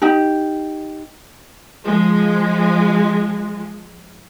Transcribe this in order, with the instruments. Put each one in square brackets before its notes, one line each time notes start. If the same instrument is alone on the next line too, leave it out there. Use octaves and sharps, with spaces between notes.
[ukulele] D#4 G4
[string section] F3 G#3